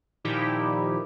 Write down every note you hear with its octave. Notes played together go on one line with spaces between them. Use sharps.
A#2 D#3 F3 D#4 E4 G4